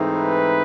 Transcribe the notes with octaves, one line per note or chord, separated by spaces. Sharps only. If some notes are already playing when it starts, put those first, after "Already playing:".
Already playing: G#2 E3 A3 C4 D#4
B4